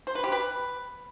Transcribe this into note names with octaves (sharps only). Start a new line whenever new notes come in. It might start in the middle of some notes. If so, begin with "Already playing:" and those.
C5
B4
G4
B4